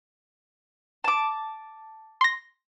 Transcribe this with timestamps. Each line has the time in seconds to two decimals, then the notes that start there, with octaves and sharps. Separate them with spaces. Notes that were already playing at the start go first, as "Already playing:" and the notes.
1.04 A5 D6
2.21 C6 A#6